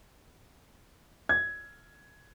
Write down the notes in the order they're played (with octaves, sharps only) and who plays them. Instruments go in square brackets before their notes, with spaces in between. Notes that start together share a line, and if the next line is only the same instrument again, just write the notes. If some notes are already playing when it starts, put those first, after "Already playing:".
[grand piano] G#6